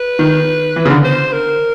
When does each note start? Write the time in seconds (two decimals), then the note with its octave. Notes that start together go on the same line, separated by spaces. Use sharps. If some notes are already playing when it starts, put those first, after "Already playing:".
Already playing: B4
0.19 D#3
0.76 E3
0.85 C#3
0.90 D3
1.04 C5
1.33 A#4